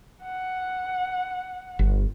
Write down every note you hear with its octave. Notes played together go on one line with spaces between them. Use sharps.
F#5
G1